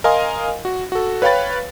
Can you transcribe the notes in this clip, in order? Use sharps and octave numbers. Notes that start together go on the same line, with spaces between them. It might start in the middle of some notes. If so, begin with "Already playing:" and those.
A#4 D#5 F5 G#5 C6 D#6
F#4
F#4 A4
B4 C#5 F5 G5 B5 A6